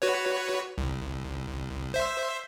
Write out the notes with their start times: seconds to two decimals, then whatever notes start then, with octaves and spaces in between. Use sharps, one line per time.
0.02 F#4 B4 C#5
0.78 C2
1.94 C5 E5